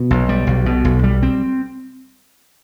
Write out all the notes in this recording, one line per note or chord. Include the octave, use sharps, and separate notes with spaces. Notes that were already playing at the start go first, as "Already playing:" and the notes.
Already playing: B2
B1
G3
B1
B2
B1
G3
C4